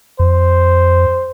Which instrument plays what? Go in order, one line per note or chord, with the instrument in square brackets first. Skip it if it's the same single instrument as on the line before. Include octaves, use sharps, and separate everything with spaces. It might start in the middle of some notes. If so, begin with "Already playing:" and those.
[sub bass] F2 [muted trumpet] C5